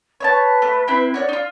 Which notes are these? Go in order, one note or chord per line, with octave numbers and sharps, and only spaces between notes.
B4 C#5 E5 A5
A3
C4 E4
F#4 C#5 D5 F#6
D#4 F4